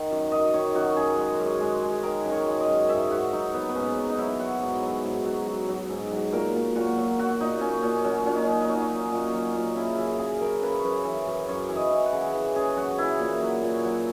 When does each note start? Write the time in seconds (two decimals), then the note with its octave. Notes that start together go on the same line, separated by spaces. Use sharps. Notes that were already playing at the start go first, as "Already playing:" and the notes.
Already playing: D#3 F#5
0.11 F#2
0.32 F#2 D#5
0.54 D#3 C#5
0.75 F#2 F#4
0.96 F#2 G#4
1.18 G#3
1.39 F#2
1.61 G#3
1.83 G#3
2.03 D#3 A#4
2.25 F#2
2.32 C#5
2.46 G#3
2.61 D#5
2.68 F#2
2.89 G#2 E5
3.10 G#2 F#4
3.33 F#3 D#4
3.54 F#3 B3
3.69 B3
3.75 G#2 C#4
3.97 F#3
4.10 D#4
4.18 F#3 E4
4.40 F#3 F#4
4.62 G#2
4.83 F#3
5.04 G#2
5.25 F#3
5.46 F#3
5.69 F#3
5.90 G#2
6.12 F#3
6.32 A#2 A#4
6.55 A#2
6.75 A#2 F#4
6.97 F#3
7.19 F#3 F#4
7.40 A#2 D#4
7.61 A#2 C#4
7.83 A#2 C#4
8.04 F#3 C#4
8.26 A#2 C#4
8.34 D#4
8.48 F#3
8.62 D#4
8.69 F#3
8.91 F#3
9.12 A#2
9.34 F#3
9.55 A#2
9.76 C#3 E4
9.98 F#2 E4
10.19 C#3 G#4
10.41 F#2 A#4
10.62 C#3 B4
10.74 C#5
10.84 F#2 B4
11.05 E3
11.27 F#2
11.48 F#2 C#5
11.69 E3
11.76 D#5
11.91 E3
12.06 F#5
12.13 C#3
12.34 E3
12.56 C#3 G#4
12.77 F#2 F#4
12.98 E3 E4
13.19 A#2
13.41 F#3
13.62 A#2
13.84 F#3